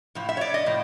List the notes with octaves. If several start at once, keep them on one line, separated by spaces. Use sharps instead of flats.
A2 F3
E5
C#5
D5
D#5
A2 F3